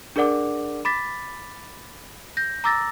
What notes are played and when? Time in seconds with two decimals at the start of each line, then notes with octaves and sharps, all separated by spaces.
0.16 D4 G#4 A#4 D5 F#5 D6
0.85 B5 D6 A6 B6
2.37 G6 A#6
2.64 A#5 D6 E6 A6 A#6